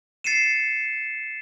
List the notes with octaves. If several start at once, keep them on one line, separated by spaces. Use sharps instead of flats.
A6 C7 C#7 D#7 E7